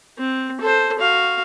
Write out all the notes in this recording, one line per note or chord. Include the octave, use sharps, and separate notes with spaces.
C4
A4 C5
F#4 F5